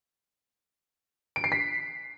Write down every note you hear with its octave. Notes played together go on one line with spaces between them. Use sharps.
D7
C7
B6